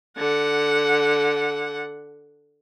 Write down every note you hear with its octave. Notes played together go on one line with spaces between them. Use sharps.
D3 F#5